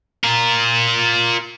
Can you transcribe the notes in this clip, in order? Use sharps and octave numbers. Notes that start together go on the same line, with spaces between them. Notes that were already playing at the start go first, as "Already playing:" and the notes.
F4 A#4